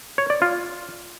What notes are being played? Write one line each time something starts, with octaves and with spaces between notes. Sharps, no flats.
C#5
D5
F4